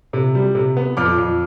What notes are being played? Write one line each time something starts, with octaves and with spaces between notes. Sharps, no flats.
C3
G3
C3
B3
F2 D6 F6
F2